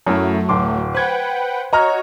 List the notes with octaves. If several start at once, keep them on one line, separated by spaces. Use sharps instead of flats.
F#2 F#3 A3 E4
D1 C6 D6
B4 C5 F#5 G5 G#6
F#4 C#5 D#5 A#5 F6